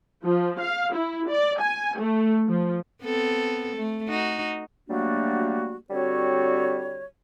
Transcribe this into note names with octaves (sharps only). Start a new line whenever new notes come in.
F3
F5
E4
D5
G#5
A3
F3
B3 C4 A4
A3
D#4 F#4
F#3 G3 A3 A#3 D4 F#4
D3 G3 C4 F#4 C#5